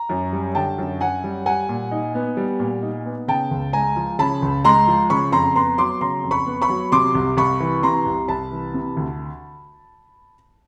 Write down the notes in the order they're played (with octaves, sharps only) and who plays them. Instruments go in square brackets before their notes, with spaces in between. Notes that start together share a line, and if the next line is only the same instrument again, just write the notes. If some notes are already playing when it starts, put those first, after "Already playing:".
Already playing: [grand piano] A#5
F#2
G3
D3 G5 A5
F#2
F#2 F#5 G#5
G3
G3 F#5 G#5
A#2
D#4
B3
G3
A#2
D#4
B3
C#3 G5 A5
C#2
G#3 G#5 A#5
F3
C#3 A5 B5
C#2
G#3 A#5 C6
F3
C#3 B5 C#6
F2 A#5 C6
B3 A#5 C6
F#3 C6 D6
C#3 A#5 C6
F2
B5 C#6
B3
B5 C#6
F#3
C3 C6 D6
C2
C2 B5 C#6
E3
C3 A#5 C6
C2
C2 A5 B5
E3
C3
D2